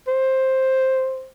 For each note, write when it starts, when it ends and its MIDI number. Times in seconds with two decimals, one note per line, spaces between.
0.08 1.28 72